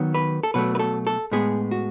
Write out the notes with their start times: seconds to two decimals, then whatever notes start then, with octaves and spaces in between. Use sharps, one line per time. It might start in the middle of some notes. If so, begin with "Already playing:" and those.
Already playing: D#3 F#3 B3
0.15 B4
0.43 A4
0.54 B2 F#3 A3 B4
0.75 B4
0.79 A4
1.07 A4
1.31 A2 G#3 B3 G#4
1.71 F#4